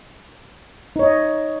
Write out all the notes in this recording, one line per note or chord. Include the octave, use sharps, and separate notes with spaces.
D#4 C#5 D#5